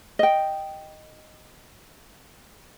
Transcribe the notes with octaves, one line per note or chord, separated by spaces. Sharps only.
D#5 G5